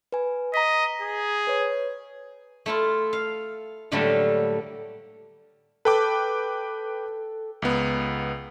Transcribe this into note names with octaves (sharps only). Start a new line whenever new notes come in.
B4 G#5
D#5 A#5 B6
G#4
B4 C#5
A3 E4 F4
F5
A2 D3 F#3 G3 A3 A#3
A4 B4 G5 D6
C#2 B3